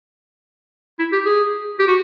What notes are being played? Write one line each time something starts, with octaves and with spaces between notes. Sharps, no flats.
E4
G4
G#4
G4
F#4